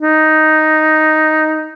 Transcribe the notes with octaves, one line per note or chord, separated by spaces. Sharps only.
D#4